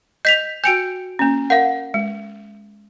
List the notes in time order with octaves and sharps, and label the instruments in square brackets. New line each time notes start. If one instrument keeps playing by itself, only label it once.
[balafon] D#5 [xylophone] G6 B6 F7
[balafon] F#4 G5 G#5 [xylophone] G6 C#7 D7
[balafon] A#3 C#4
[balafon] A#4 [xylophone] F5 F#5
[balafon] G#3